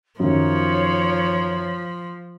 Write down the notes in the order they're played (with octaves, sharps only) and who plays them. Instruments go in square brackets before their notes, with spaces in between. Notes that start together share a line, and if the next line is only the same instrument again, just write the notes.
[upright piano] F#2 D#3 [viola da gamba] F3 [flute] C#5